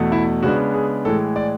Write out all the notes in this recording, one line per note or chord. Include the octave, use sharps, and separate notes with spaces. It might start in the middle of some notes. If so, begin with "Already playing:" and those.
Already playing: E2 B2 A3
E4
C#3 G#3 B3 D4 F#4
G#4
A2 E3 G#3 A4
D5